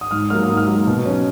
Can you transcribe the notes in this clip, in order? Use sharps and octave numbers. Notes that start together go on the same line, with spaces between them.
D#6
G#2 F6
F#3 A#3 F6
D#6
G#2
F6
F#3 A#3
B2
F#3 C#4